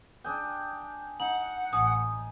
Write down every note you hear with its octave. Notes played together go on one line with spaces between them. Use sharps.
D4 G#4 G5
D#4 F#5 F#7
A1 G#5 D#6